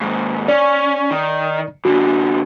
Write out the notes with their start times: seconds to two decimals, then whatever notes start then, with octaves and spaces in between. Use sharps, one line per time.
0.01 D#2 G#2
0.48 C#4 D5
1.11 D#3
1.85 F#2 D3 F#4